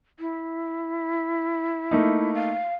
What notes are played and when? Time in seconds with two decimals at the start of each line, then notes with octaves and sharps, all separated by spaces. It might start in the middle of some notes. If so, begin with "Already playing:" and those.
0.20 E4
1.91 A3 A#3 D#4
2.35 F5